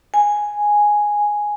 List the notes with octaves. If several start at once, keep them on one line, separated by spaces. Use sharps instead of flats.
G#5